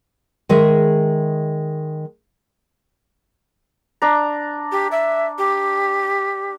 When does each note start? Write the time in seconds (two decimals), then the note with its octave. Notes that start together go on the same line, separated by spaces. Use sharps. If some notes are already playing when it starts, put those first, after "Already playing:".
0.49 D#3 G#3 G#4 E5
4.02 D4 A#5
4.72 G4
4.91 E5
5.38 G4